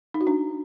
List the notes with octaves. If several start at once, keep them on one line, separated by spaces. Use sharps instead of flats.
D#4
F#4
D4